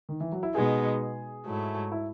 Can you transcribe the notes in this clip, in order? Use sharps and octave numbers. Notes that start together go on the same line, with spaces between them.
D#3
E3
F#3
E4
B2 G#3 B3 D#4 G#4
G#2 F#3 A3 E4
E4